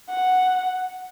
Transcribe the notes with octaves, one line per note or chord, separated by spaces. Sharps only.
F#5